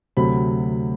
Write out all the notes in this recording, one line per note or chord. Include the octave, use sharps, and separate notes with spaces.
D2 C3 F#3 B5